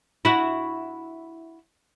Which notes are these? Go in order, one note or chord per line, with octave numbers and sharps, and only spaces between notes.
E4 F#4